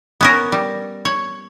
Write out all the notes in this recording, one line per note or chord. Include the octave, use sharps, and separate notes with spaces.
B3 C#4 A#4
G3
C#5